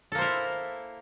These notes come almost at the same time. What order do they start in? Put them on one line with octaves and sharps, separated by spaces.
A4 A#3 C5 A#4 E4